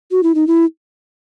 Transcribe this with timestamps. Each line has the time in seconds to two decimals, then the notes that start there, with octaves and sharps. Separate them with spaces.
0.11 F#4
0.23 E4
0.35 D#4
0.47 E4